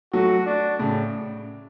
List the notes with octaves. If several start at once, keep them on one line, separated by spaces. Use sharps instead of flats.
F#3 A3 F#4
D4
A2 C#3